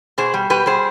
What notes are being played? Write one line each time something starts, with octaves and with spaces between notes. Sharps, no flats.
B2 G#4 C5
G3
B2 G4 B4
G3 G#4 C5